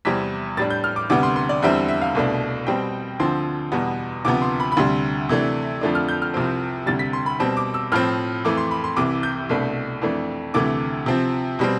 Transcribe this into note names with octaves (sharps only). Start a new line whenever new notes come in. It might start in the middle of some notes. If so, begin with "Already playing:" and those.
E2 C3 E3 G3 C4 B6
A2 G3 D4 A6
G6
F6
D6
D2 C3 G3 B3 D6
C6
C6
D5
E2 D3 G3 C4 E5
E5
F5
C2 B2 A3 D4
B2 G3 C4 G5
D2 D3 F3 C4 C6
E2 B2 G3 B3
D2 C3 F3 B3 D6
C6
B5
B5
D2 C3 G3 C6
C3 E3 A3 D4
F2 D3 F3 A3 D4
F6
G6
F6
C2 C3 F3 C4
D2 C3 G3 A6
B6
C6
B5
B2 G3 C4 A5
D6
E6
A2 F3 C4 F6
F2 E3 A3 D6
C6
B5
C6
C2 C3 E3 D6
G6
C2 B2 A3 D4
F2 E3 A3 D4
D2 C3 E3 A3 D6
C3 F3 C4
B2 G3 C4